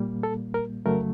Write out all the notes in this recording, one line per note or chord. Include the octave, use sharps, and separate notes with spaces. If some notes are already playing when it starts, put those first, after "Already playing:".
Already playing: A#2 G3 A#3
A4
A#4
F2 C#3 F#3 A3 A#4